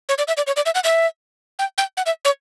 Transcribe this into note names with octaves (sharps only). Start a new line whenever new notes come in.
C#5
D5
E5
D5
C#5
D5
E5
F#5
E5
G5
G5
F#5
E5
C#5